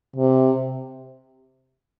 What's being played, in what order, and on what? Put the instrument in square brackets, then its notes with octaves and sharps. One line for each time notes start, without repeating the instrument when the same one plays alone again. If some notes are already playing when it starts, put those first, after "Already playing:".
[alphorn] C3